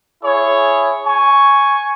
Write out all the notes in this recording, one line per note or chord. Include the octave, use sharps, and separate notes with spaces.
E4 G#4 C#5
G#5 C#6